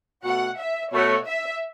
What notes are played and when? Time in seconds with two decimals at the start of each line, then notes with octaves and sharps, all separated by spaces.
0.24 B2 A3 F#4 F#5
0.59 E5
0.92 B2 A3 F#4 C#5
1.26 E5